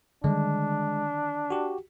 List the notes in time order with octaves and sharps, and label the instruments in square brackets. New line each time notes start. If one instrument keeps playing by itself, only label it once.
[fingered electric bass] D3 D#3 G3 [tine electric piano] G#3 [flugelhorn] D4
[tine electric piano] F#4 G4